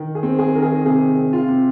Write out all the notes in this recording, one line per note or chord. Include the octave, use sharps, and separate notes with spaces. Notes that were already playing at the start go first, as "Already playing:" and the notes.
Already playing: D#3
G#4
C4
G#4
D#3 A#4
G#4
C3 G#4
C3
F4
C3